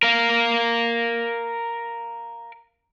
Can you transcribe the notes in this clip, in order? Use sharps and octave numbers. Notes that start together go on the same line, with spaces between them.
A#4 F5